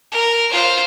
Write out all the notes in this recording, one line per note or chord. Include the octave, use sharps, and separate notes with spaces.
A#4
F4 C5